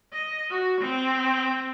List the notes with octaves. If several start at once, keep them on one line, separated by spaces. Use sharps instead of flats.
D#5
F#4
C4